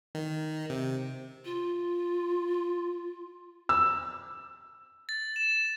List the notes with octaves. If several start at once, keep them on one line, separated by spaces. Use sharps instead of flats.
D#3
C3
F4
E6
A6
E7